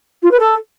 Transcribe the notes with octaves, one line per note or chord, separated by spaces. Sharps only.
F4
B4
A4